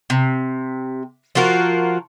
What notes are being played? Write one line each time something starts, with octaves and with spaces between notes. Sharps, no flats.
C3
F3 F4 F#4 A#4